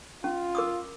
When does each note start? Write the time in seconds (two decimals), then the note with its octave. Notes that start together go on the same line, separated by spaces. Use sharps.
0.24 C#4 F4
0.55 A#4 D6 D#6